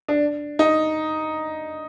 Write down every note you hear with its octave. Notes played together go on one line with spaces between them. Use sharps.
D4
D#4